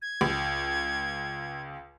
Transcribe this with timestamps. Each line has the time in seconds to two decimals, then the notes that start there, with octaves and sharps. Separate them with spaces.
0.02 G#6
0.21 C#2